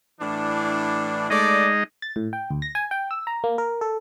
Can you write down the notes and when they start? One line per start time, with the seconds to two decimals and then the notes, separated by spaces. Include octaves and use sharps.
0.21 A2 E3 D4
1.30 G#3 A3 D#4 D5 D#5
2.02 A6
2.16 A2
2.33 G5
2.50 D2
2.62 A#6
2.75 G#5
2.91 G5
3.11 E6
3.27 A#5
3.44 A#3
3.58 A#4
3.81 A4